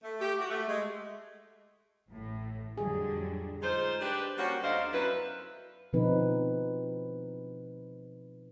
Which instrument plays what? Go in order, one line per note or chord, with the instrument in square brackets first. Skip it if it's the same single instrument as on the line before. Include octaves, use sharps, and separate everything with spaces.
[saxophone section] A3
G4
F#4
A3
G#3
[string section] A1 A2
[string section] F2 D3 F#3 [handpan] G3 G#4
[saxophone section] G#3 D#4 F4 C5
D4 G4 B4
G3 A#3 C#4 F#4
D2 D3 D#4 C5 D5 F5
F#2 E4 A#4 B4
[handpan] B2 D3 F3 C4 D#4 B4